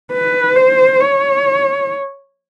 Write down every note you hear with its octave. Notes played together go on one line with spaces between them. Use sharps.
B4
C5
C#5